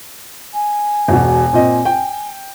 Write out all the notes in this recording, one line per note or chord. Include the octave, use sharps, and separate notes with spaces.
G#5
E1 B2
A#2 C4 D#5
G5